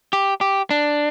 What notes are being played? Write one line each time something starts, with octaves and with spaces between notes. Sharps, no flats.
G4
G4
D4